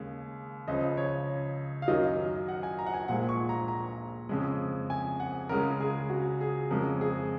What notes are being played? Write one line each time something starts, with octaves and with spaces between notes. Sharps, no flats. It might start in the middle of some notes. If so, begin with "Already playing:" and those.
Already playing: D#2 C#3 G#3
C#2 C#3 F3 D#5
C#5
F5
F#2 D#3 F#3 D#5
F#5
G#5
A#5
F#5
G#5
A#2 F3 G#3 F#5
C#6
A#5
A#5
F2 C#3 G#3
G#5
F#5
C#2 C#3 G#3 A#4
G#4
F#4
G#4
F2 C#3 G#3 A#4
G#4